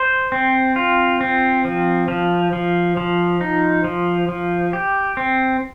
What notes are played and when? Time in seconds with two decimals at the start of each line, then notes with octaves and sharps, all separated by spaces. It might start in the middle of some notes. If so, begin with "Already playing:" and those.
Already playing: C5
0.32 C4
0.76 F4
1.21 C4
1.65 F3
2.08 F3
2.53 F3
2.97 F3
3.41 D#4
3.84 F3
4.29 F3
4.73 G4
5.17 C4